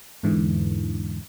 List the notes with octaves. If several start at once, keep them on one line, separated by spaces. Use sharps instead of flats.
E2 G#2 D3 E3